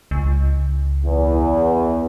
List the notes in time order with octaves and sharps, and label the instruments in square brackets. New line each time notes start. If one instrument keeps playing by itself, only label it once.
[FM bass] C#2
[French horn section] E2